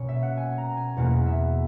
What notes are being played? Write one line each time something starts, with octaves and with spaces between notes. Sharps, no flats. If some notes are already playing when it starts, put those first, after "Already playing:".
Already playing: B2 A#3 C#4 C#5
E5
F#5
G#5
A#5
G#5
E2 B2 A#3 F#5
E5